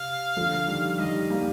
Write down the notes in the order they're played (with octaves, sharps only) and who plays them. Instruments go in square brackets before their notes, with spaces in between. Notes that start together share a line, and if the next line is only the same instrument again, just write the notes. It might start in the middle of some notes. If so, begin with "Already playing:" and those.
Already playing: [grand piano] C3 [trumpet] F5
[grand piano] D3 F3
D#3 G3
[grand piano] D#3 G3 [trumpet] D#5
[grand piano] G3 A#3